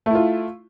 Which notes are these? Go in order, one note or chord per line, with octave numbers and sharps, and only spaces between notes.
A3 E4 F4